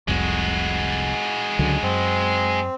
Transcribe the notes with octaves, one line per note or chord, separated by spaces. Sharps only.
F1 C2 F2 G#3 F#4
C#2 D3 F#3
F#2 C4